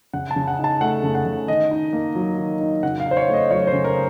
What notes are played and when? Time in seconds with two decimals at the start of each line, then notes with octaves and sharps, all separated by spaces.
0.13 C#3 F#5
0.31 A5
0.36 C#3
0.48 F#5
0.59 D#4
0.64 A5
0.81 A3 F#5
1.03 C#3
1.15 F#5
1.25 C#3
1.48 D#3 D#5
1.71 D#4
1.93 A#3
2.15 F#3
2.38 D#3
2.61 D#4
2.83 C#3 F#5
3.00 F5
3.06 D#4
3.11 C5
3.17 C#5
3.28 A3
3.34 D#5
3.50 F#3 C#5
3.67 C5
3.73 C#3
3.84 A#4